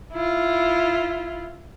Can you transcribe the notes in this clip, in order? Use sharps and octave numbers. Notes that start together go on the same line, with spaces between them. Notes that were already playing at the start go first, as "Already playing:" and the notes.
E4 F4